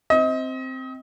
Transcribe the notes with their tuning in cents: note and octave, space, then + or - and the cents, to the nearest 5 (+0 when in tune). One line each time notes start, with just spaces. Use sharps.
C4 +0 D#5 +30